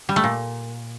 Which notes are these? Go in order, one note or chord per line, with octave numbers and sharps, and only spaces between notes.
G3
A3
A#2